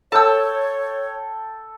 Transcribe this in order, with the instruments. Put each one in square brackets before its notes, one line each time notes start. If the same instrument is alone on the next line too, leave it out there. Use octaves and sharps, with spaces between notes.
[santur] A4 G5 [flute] C#5 [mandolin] A5 E6